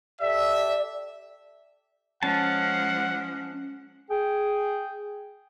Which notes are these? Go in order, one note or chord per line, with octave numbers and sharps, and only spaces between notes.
G4 A4 D5 E5
F3 G#3 C#4 F#5 A5
G#4 G5